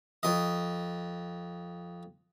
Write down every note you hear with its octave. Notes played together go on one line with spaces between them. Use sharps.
F2 D#5